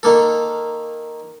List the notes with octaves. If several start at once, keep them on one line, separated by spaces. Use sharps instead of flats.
D#3 A#3 A4